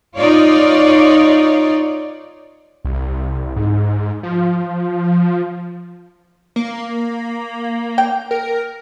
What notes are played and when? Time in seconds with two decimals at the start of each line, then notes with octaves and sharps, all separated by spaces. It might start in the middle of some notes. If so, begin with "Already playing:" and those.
0.17 D#4 F4 C#5 D5
2.85 C2
3.56 G#2
4.23 F3
6.56 A#3
7.98 G5
8.31 A#4